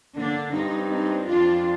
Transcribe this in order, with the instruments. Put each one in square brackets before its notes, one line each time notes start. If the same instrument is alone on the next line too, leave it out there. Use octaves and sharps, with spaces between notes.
[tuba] D3 [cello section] A#3 D4
[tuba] G2 [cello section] C4 D#4
[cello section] C4 D#4
[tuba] F2 [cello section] D4 F4